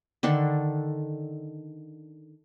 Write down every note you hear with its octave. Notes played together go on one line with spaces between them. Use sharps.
D3 D#3 D4 A4